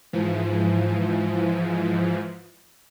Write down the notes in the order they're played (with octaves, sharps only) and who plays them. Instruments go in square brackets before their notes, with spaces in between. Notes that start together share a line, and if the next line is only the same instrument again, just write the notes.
[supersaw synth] G#2 E3 F3